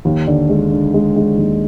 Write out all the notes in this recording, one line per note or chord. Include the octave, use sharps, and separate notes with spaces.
D#2
D3
G#3
D3
G#3
G#3
D#2